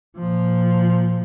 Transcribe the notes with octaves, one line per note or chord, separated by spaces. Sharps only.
A#2 F3